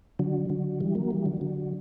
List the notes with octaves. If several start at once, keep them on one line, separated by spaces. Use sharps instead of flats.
D3 F#3
D3 F#3
E3 G3
F#3 A#3
E3 G3
D3 F#3
D3 F#3